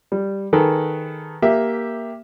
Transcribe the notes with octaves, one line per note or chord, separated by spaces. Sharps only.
G3
D#3 G#4 A4 B4
A#3 G4 E5